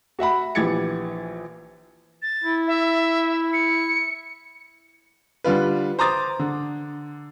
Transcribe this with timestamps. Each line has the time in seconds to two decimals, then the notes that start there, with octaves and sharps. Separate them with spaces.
0.19 F#4 E5 F#5 B5
0.55 A#1 E3 G4 G#6 A6 C#7
2.22 A6
2.44 E4
2.67 E5
3.53 C#7
5.44 D3 G3 F4 B4
5.99 C5 A#5 D6 D#6 A6
6.39 D3